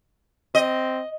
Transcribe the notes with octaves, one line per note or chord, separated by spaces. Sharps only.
C4 D#5